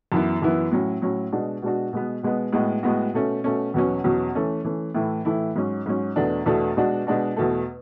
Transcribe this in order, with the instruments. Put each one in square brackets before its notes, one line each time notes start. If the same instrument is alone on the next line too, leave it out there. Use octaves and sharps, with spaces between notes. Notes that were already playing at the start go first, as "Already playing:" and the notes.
[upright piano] F#2 E3 B3 E4
F#2 E3 B3 E4
A2 F#3 C#4
A2 F#3 C#4
B2 G#3 D4 F#4
B2 G#3 D4 F#4
B2 G#3 B3
B2 G#3 B3
A2 G#3 B3 F#4
A2 G#3 B3 F#4
B2 A3 C#4
B2 A3 C#4
E2 B2 F#3 C#4
E2 B2 F#3 C#4
E3 A3 C#4
E3 A3 C#4
A2 E3 A3 E4
A2 E3 A3 E4
G#2 F#3 C#4
G#2 F#3 C#4
E2 B2 A3 D4
E2 B2 A3 D4
B2 G#3 D4 F#4
B2 G#3 D4 F#4
E2 B2 A3